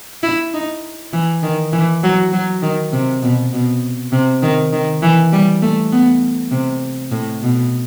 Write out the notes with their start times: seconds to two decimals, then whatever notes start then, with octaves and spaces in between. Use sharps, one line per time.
0.23 E4
0.54 D#4
1.13 E3
1.43 D#3
1.73 E3
2.03 F#3
2.33 F#3
2.62 D#3
2.93 C3
3.22 B2
3.53 B2
4.12 C3
4.42 D#3
4.73 D#3
5.03 E3
5.32 G3
5.62 A3
5.92 B3
6.52 C3
7.11 A2
7.42 B2